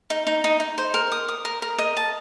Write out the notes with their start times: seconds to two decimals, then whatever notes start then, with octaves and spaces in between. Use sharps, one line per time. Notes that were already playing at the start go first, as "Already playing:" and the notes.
0.10 D#4
0.27 D#4
0.44 D#4
0.60 D#4
0.78 C5
0.94 A#4
1.12 D#6
1.28 D#6
1.45 A#4
1.62 A#4
1.78 D#5
1.97 A5